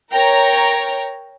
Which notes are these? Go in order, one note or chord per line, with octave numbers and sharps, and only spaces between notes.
A#4 C#5 G5 A#5